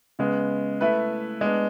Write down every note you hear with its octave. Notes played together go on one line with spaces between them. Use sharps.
C#3 G#3 B3
A3 E4 B4
G#3 B3 D4